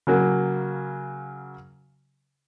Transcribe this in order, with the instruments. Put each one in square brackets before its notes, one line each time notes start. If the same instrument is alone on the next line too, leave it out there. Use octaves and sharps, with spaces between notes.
[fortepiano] C#3 F#3 A#3